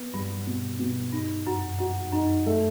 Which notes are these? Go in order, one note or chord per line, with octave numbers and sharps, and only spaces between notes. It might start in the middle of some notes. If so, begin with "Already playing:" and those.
Already playing: B3
G2 G3
B2
B2
G2 D#4
F#2 F#4
F#2 F#4
F#2 D#4
A3